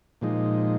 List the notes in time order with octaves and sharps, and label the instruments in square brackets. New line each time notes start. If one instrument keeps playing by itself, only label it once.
[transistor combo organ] A#2 F3 G#3 D#4